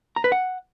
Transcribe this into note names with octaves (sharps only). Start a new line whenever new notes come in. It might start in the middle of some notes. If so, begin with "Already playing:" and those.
A#5
B4
F#5